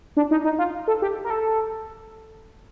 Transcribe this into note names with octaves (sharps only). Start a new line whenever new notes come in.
D4
D#4
D#4
F4
A4
G4
A#4
A4